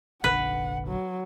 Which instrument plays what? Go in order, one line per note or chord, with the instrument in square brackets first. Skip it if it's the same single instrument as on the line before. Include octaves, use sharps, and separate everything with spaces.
[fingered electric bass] F1 A#1 D3 [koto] B4 [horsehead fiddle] F#5
[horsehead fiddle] F#3